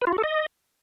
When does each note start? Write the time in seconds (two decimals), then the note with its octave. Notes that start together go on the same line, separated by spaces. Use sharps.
0.02 B4
0.07 F4
0.13 F#4
0.18 A4
0.24 D#5